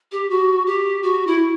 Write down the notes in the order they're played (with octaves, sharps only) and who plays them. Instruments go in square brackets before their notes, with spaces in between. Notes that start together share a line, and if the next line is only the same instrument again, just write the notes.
[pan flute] G4
F#4
G4
F#4
E4